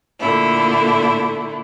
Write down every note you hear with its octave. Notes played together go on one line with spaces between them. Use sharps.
A#2 D3 A3 E4